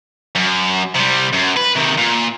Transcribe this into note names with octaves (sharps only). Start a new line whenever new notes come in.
F#2
C3 G3
F#2
B4
C3 D#3
A#2